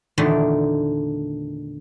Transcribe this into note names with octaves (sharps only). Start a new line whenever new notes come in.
E2 A#2 D3 D#3 A3